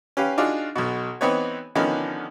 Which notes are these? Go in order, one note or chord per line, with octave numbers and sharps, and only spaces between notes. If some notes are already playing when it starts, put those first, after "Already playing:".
C#4 G4 B4 F5
D4 D#4 F4 F#4 G#4
B1 B2
E3 B3 C4 D#4 B4 C#5
D3 D#3 F3 B3 C#4 D#4